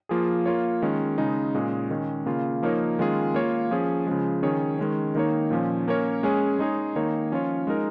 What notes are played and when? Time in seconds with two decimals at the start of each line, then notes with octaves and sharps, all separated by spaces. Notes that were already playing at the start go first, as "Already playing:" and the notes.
0.09 F3 A#3 F4 G#4
0.46 A#3 F4 C#5
0.82 D#3 G#3 C#4
1.18 C#3 G#3 D#4
1.55 A#2 G#3 C#4 G#4
1.90 D#3 G#3 C#4
2.26 C#3 A#3 F4
2.63 F3 A#3 D#4 A#4 C#5
2.99 D#3 G#3 C#4 F4 G#4
3.35 A#3 F4 C#5
3.71 F3 C#4 G#4
4.07 C#3 F3 G#3
4.43 D#3 C#4 G#4 C#5
4.79 D#3 G#3 C#4
5.15 D#3 A#3 D#4 C#5
5.51 A#2 F3 C#4
5.88 A#3 C#4 A#4 C#5
6.23 G#3 C#4 G#4 C#5
6.59 G#3 D#4 G#4 C#5
6.96 D#3 A#3 D#4 C#5
7.32 F3 C#4 F4 C#5
7.67 G#3 D#4 A#4